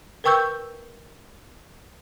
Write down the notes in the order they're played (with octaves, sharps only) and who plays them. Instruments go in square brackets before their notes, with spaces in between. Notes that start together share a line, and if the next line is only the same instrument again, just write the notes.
[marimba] A#4 B4 G5 C#6 E6 G6